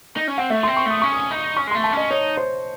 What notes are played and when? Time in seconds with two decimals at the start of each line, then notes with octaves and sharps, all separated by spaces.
0.16 D#4
0.28 C#4
0.38 C4 F#5
0.50 A3 E5
0.63 C6
0.67 C4
0.77 C#6
0.86 A3 D#6
1.02 C#4 C#6
1.13 D#6
1.31 D#4
1.57 C#4 C#6
1.67 G#3
1.71 C6
1.75 A3
1.84 A5
1.93 C#4 D#5
2.11 D#4 C#5
2.37 C5